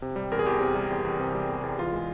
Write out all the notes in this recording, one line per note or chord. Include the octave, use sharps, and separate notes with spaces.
C3
G3
E2 A#4
G#4
E2 G4
C3
G3
E2
E2
C3
G3
E2
E2
E3 F4
G#3